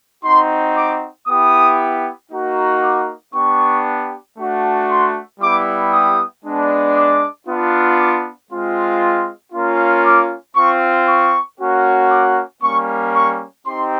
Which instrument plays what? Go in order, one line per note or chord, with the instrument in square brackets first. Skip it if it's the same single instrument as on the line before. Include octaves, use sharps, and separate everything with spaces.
[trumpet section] C4 D#4 F#4 C6
D6
B3 E4 G4 D#6
A#3 D#4 F#4
D6
B3 D4 G4 C#6
A3 D4 F#4
C6
G3 B3 E4 G4 D6
D#6
G#3 B3 D4
D6
B3 D4 F4
D6
G#3 C4 F4
A#3 C#4 F4
D6
C4 F4 C#6
C#6
A#3 C#4 F#4
D6
G3 A#3 C#4 C#6
C#6
C4 D#4 G4 C6